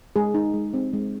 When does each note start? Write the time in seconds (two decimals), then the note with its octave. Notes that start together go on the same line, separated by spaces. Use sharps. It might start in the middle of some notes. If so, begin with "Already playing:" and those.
0.16 G#3 G#4
0.34 D#4
0.54 G#3
0.74 C4
0.93 G#3